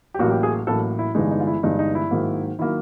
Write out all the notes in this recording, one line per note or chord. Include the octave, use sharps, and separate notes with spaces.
G4
A1 A2 F#3 A#3 F#4
G4
G#4
A1 A2 F#3 A#3 A4
E4
G1 G2 E3 G#3 D#4
D#4
F4
E4
G1 G2 E3 G#3 D#4
D#4
E4
G#2 D#3 F#3 A#3
D#3 F#3 A#3 E4